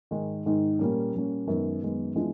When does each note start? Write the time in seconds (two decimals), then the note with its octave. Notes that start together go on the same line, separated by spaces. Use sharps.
0.11 G#2 D#3 G#3
0.46 G#2 D#3 G#3
0.79 A#2 G3 A#3 C#4
1.13 A#2 G3 A#3 C#4
1.47 F#2 D#3 G#3 B3
1.82 F#2 D#3 G#3 B3
2.16 E3 G#3 B3 D4 F4